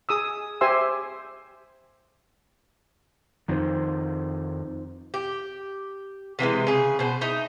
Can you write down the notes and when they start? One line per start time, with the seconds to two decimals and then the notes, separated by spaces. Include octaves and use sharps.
0.09 G#4 D#6 E6
0.61 G4 C5 E5 G#5 C6 E6
3.48 F2 D#3 D#4 F4 C5
5.14 G4
6.39 C3 E3 F3 G#3
6.67 C#3 G#4
6.99 B2 C5
7.21 D#4 D#5 E5